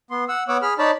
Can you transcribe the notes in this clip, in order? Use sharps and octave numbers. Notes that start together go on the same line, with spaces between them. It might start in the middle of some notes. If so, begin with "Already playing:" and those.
B3 C6
F#5 E6
B3 C#5 F#5 D6 E6
G#4 B5 F6
D#4 C#5 D5 A5 B5